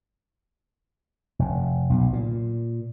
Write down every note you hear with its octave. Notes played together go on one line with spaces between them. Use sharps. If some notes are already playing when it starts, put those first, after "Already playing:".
F1
B1
A#2